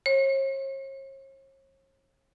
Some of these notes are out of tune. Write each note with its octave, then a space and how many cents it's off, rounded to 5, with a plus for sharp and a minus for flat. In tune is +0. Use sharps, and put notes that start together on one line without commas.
C#5 -45